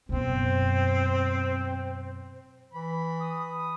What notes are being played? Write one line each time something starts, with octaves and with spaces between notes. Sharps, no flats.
F#2 B2 C4 C5
E3 B5
D#6